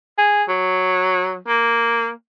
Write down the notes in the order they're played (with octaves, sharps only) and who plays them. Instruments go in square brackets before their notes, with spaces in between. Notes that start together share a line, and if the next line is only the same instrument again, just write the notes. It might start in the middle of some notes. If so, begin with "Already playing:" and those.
[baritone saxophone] G#4
F#3
A#3